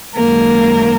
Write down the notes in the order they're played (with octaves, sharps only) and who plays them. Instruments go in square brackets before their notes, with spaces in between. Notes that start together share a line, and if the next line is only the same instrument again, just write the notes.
[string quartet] F#2 D#3 G#3 A#3 A#4